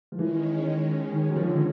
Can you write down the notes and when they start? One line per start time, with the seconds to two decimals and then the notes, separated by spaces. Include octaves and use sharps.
0.12 F3
0.18 D#3 E3 G#3 C#4
1.13 D#3
1.28 F#3
1.36 F3
1.48 D3